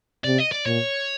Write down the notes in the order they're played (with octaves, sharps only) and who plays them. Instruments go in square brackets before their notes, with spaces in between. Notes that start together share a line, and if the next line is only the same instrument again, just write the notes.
[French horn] C3 [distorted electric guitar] D5
[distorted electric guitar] D#5
D5
[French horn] A#2 [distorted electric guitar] C#5